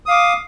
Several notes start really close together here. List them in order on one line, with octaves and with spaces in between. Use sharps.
D#6 F5 D6